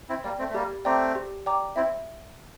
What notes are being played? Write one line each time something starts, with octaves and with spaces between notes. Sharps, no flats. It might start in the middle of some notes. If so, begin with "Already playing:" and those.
C4 E4
G3 A#3 D5 G5
A3 C4
A3
G3 A#3 G4
A3 C4 D5 G5 A#5 D6
G4
D5 G5 A#5 D6
C4 E4 E5